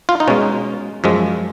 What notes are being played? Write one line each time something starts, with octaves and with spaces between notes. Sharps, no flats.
F4
D#4
B2 G#3 C#4
F#2 F3 G#3